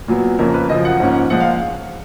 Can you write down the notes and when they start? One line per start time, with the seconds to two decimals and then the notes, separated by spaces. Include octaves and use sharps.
0.08 A#2 F#3 B3
0.39 F2 C#3 F3 A#3 C#4 A#4
0.54 B4
0.69 F#2 C#3 F3 D#5
0.85 F#5
1.00 G#2 F3 A#3 C#4
1.30 A#2 F3 G#3 F#5
1.40 F5